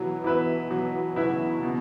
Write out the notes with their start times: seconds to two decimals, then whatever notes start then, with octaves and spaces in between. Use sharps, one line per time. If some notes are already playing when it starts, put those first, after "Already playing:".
Already playing: B2 E3 F#3
0.24 E4 B4 E5
0.70 B2 E3 F#3
1.16 C#3 F#3 E4 B4 E5
1.63 B2